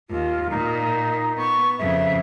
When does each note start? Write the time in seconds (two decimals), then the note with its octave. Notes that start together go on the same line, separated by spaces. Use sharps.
0.10 D#2 F4
0.51 A#2 D#4
1.37 B3 C#6
1.79 F2 C#3 E5